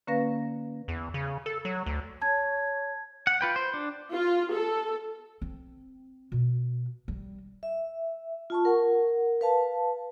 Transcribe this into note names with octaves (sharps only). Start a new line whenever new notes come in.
D3 A#3 C#4 B4 F5 A#6
E2
C#3
A4
F#3
D2
C#5 A5 G#6
F#5
F4 B4 G5
C5
D4
F4
A4
C4
B2
G3
E5
F4 A5 C#6
A#4 F#5
B4 F5 A5